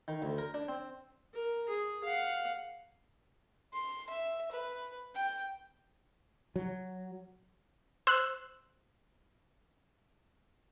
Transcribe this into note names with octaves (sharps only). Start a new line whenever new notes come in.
D#3
D2
A#4
D4
C4
A#4
G#4
F5 F#5
C6
E5
B4
G5
F#3
C5 E6 F#6